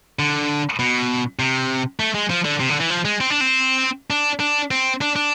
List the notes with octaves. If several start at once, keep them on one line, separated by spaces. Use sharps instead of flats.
D3
B2
C3
A3
G#3
F3
D3
C3
D3
E3
F3
G#3
C4
D4
C4
D4
D4
C4
D4
D4